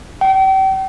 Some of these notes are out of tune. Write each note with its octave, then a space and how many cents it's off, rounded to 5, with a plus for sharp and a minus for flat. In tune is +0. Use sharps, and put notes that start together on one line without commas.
G5 -35